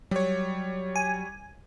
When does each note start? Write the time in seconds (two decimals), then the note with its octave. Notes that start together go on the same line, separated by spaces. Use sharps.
0.11 F#3 G3 C#5
0.96 G#5